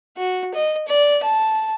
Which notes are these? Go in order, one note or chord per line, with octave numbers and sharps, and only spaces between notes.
F#4
D#5
D5
A5